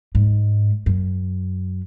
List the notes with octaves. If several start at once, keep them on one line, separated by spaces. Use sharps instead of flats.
G#2
F#2